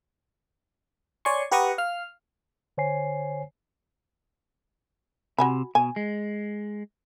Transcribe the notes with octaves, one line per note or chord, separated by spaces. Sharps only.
C#5 D5 G#5 C6 C#6
G4 B4 F#5 A#5 C#6 D#6
F5 F6
D3 C5 C#5 G#5 C7
C3 F#4 G#5 B5
B2 G#5
G#3